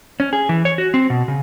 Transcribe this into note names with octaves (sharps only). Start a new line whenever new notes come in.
C#4
G#4
E3
C#5
F#4
C4
B2
C#3